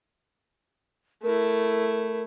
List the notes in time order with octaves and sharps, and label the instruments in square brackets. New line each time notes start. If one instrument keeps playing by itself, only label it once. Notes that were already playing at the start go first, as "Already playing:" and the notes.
[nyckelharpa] A3 E4 [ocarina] A#4